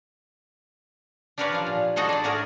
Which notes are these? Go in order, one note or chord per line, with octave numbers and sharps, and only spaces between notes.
D4 G4 A#4 B4 C#5 D5
F3 F5
A#2
D#4 F#4 G#4 A4 C5
D4 D5
A2 A3 F#4 G#4 A#4